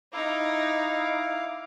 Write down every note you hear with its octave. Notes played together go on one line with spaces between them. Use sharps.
D#4 E4 F5 D6